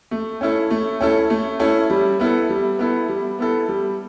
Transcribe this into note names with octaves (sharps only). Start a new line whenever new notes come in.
A3
C#4 E4 A4
A3
C#4 E4 A4
A3
C#4 E4 A4
G3
B3 E4 A4
G3
B3 E4 A4
G3
B3 E4 A4
G3